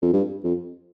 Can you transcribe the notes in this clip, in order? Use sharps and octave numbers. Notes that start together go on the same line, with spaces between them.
F2
G2
F2